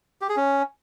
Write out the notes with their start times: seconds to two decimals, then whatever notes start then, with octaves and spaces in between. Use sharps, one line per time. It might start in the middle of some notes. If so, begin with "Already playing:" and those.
0.21 G4
0.29 G#4
0.37 C#4